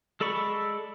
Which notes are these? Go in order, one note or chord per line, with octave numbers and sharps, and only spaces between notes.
G#3 A4 D5 B5 C#6